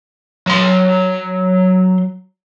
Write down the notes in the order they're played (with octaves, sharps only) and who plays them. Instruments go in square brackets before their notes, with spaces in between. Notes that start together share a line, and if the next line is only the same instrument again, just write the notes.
[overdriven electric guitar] F#3 C6